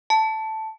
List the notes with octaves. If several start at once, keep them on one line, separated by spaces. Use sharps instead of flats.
A5